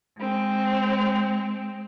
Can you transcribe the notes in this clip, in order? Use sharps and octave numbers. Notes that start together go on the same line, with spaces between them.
G#3 C4